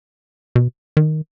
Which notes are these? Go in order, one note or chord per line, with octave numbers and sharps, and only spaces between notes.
B2
D#3